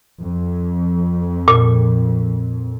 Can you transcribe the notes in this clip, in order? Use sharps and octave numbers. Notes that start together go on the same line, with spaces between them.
F2
A#2